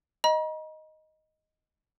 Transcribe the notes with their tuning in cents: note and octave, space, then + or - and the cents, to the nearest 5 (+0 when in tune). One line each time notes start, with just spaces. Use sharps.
D#5 +0 A#5 +45